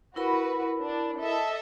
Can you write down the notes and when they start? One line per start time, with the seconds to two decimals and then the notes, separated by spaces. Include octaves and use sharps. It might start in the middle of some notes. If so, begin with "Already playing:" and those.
0.16 E4 F#4 A#4 B4 B5
0.81 D4
1.20 A4 D#5 E5